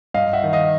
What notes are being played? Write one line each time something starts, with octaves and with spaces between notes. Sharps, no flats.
G2 D#5 F5
E5 F#5
D#3
D#5 F5